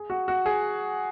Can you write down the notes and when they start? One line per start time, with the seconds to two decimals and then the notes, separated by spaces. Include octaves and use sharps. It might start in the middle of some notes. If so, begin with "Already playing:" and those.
Already playing: G#4
0.10 F#4
0.28 F#4
0.46 G#4